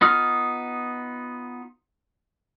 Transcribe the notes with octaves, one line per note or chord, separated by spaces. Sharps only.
B3 D#4 F4 D#6 F6